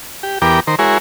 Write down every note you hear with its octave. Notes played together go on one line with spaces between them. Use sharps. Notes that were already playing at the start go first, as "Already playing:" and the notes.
G4
E2 B3 G4 A#4 G5 D6
D#3 A#4 C5
G#3 E4 F#4 G#4 A#4 C#5